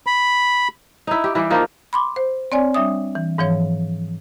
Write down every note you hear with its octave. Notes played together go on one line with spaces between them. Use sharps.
B5
D#4 E4
G4
E3 G3 E4 G4
F3 A#3 D#4 F4
B5 C6 D6
C5
C4 C#5 D5 G#5
G3 D4 E5 D#6
E3
G#2 E3 F3 C#5